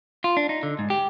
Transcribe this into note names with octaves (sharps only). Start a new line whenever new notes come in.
F4
D4
D#4
D3
G#2
G4